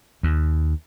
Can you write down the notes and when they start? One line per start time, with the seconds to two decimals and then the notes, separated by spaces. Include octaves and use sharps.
0.23 D#2